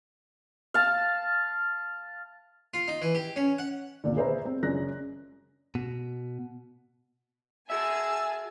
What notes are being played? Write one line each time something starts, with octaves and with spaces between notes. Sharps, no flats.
F5 A5
F4
D#4
E3
G4
C#4
F#5
G#1 D2 A#2 D3
G#4 B4 C5 D5 E5 A#5
C4
F#1 F#2 D4 G#4 F#6 A#6
B2
F#4 G#4 E5 G#5 A5 E6